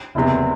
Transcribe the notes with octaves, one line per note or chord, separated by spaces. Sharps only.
F#1 E2 C3